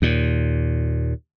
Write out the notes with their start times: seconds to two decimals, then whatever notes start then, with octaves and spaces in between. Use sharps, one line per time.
0.02 D#2 A#2